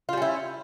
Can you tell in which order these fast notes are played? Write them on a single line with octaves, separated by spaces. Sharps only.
F4 G3 C#4 E4